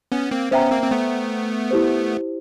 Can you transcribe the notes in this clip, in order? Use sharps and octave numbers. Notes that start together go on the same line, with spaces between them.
B3 C#4
A#3 C4
B3 C#4 C5 E5 G5 A#5
A#3 C4
C4
A3 B3
E4 G4 C5